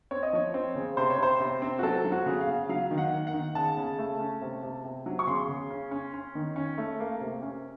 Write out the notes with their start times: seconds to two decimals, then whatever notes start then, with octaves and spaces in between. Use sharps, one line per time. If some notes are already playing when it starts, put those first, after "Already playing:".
0.11 C4 C#5
0.23 D#5
0.33 F3 C#5
0.54 C4
0.76 C#3
0.97 C3 C5
1.10 C#5
1.18 C3 C5
1.40 C3
1.62 C4
1.79 F#4
1.83 F#3 A4
2.05 F#3
2.12 F#4
2.26 C#3
2.41 F5
2.48 C#3
2.69 F#3 F5
2.91 D#3
2.98 F#5
3.13 A#3
3.27 F#5
3.34 D#3
3.55 C#3 A5
3.77 C#3
3.99 A3
4.20 C#4
4.42 C3
4.63 C3
4.84 C3
5.06 F#3
5.19 C#6
5.27 C#3 C6
5.49 C#3
5.71 C#4
5.91 C#4
6.14 C#4
6.35 D#3
6.56 C#4
6.78 A3
7.00 A#3
7.21 C3
7.42 C#4